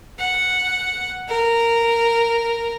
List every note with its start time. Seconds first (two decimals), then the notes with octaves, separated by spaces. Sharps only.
0.19 F#5
1.29 A#4